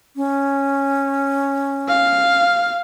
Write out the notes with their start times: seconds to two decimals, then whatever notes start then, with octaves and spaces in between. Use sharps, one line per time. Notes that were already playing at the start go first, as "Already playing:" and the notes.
0.16 C#4
1.88 F5